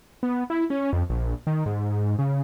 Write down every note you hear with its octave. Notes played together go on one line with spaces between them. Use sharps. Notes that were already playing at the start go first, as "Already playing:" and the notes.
B3
E4
C#4
F2
A#1
D#3
G#2
C#3